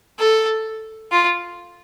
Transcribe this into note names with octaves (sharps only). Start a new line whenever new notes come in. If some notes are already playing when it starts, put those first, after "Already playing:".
A4
F4